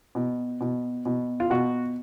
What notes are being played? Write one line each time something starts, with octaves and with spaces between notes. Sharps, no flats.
B2
B2
B2
F4
B2 F#4